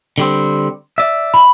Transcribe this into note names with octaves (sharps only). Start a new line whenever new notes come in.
D3 G3 C4
D5 E5
B5